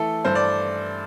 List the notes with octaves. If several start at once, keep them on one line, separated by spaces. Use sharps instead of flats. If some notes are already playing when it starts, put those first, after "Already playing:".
Already playing: E3 A3 A4
G2 C5
D5